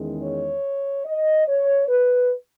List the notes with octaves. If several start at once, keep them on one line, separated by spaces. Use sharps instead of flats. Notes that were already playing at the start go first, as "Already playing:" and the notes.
Already playing: E2 D#3 G#3 C#4
C#5
D#5
C#5
B4